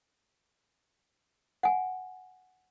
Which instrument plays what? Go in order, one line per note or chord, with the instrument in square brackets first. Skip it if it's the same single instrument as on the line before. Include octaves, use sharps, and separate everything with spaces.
[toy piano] F#5 G#5